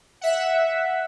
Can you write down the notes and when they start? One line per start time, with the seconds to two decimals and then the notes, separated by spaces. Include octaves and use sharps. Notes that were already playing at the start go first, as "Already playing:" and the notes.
0.21 E5 F#5